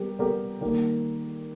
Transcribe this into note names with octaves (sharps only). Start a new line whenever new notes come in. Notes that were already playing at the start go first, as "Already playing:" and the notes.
Already playing: G3 B3 G4 A#4
G3 B3 G4 A#4
D#3 G3 A#3